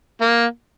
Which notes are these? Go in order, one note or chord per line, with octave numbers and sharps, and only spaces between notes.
A#3